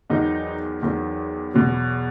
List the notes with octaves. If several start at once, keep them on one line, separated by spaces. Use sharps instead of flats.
E2 D#3 F#3 D#4
E2 D#3 F#3
E2 B2 F#3